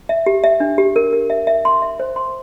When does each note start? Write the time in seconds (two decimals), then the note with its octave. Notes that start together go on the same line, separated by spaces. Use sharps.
0.09 E5
0.26 G4
0.44 E5
0.60 D4
0.78 G4
0.96 A#4
1.13 A#4
1.30 E5
1.47 E5
1.65 C6
1.82 E5
2.00 C5
2.16 C6